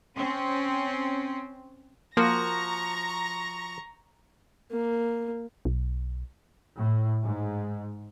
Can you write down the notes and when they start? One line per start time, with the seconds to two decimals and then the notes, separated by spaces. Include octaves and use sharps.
0.15 C4 C#4
2.17 F3 A#3 F#4 A#5 C#6 A#6
4.72 A#3
5.65 B1
6.77 A2
7.23 G#2